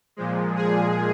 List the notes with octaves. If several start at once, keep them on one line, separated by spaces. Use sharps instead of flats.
A#2 F3 G#3
G#4